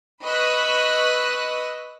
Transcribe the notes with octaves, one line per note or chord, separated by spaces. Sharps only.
B4 D#5 B5 C#6 E6 F#6